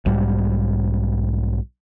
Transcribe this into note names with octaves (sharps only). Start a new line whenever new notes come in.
B1 G#2 G3